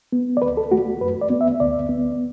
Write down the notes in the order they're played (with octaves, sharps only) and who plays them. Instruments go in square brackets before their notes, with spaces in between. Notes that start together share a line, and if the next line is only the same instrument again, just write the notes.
[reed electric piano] B3
D5
D2 B4
A4
A3 F#4
F#2 B4
D5
B3
E5
D2 D5
B3